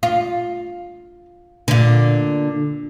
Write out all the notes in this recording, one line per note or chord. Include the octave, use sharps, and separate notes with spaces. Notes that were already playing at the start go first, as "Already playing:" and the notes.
F4
A#2 D3